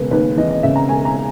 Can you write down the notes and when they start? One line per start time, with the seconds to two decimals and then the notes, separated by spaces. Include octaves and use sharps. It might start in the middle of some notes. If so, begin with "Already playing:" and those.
Already playing: E1 C#3 B4
0.11 D#2 B4
0.37 E3 D#5
0.50 D#5
0.63 C#3 E5
0.76 A#5
0.88 E1 G#5
1.05 A#5